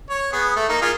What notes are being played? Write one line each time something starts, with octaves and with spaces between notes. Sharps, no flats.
C#5
B3 G#4
A3
A#3 D#4
A#3 F4 G#4